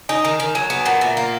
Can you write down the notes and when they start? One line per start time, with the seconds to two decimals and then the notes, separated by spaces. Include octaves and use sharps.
0.09 D#4 G#5
0.24 D#3 G#5
0.40 D#3
0.55 F#3 G#5
0.70 B3
0.80 G#5
0.86 A#2 F#5
1.01 A#2 E5
1.17 A#3